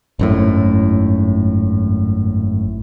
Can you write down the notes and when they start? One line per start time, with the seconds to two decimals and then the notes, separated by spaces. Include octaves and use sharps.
0.19 G#1 F#2 A2